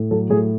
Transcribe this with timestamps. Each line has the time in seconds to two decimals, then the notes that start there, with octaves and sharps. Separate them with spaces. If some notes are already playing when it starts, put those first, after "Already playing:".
Already playing: A2
0.11 F#3 A4
0.30 A2 G#4